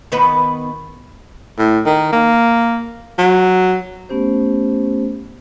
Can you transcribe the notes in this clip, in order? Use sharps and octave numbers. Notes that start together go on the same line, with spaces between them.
D#3 B3 B4
A2
D#3
A#3
F#3
A3 B3 C#4 G4 C5